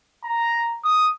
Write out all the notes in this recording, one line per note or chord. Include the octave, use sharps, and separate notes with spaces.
A#5
D#6